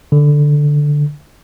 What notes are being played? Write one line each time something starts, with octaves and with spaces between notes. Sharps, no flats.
D3